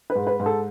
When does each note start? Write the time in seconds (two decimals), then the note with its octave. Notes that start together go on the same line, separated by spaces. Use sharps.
0.10 B4
0.15 G#2
0.27 B4
0.40 G#2
0.46 A4